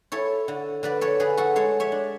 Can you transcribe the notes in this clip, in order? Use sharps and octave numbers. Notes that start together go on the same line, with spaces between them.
E4 A4 C#5
D3
D3 B4 D5
A4 C#5
D3 G#4 B4
F#4 A4
G#3 A4 C#5
C#5 E5
D4